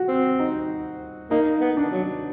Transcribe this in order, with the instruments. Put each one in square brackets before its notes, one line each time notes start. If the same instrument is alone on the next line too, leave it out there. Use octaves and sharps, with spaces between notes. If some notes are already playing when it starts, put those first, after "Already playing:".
Already playing: [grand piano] F#4
[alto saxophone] C4
[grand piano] D#4
[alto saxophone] A#3 [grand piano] D#4
[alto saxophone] B3
[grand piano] D4
[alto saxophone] F#3